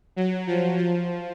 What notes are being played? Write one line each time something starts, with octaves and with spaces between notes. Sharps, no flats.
F#3
F3
F3